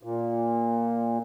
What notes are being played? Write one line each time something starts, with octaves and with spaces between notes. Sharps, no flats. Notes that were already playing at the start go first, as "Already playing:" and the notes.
A#2